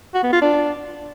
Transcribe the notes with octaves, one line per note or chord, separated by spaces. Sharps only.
F#4
B3
F4
D4